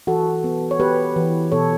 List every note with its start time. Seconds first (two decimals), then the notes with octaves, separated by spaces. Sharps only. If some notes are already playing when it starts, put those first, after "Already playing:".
0.07 E3 F#4 A4
0.44 B3
0.71 C#5
0.80 B3 G4 B4
1.16 E3
1.52 B2 A4 C#5